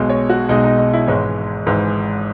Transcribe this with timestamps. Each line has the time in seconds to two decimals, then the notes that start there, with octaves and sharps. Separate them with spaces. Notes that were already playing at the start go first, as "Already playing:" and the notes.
Already playing: B1 B2 G#3
0.10 C#5
0.29 F#4
0.49 B1 B2 G#3 D#4
0.64 D#4
0.78 D#4
0.93 E4
1.08 G#1 G#2 E3 G#3 C#5
1.66 G#1 G#2 E3 G#3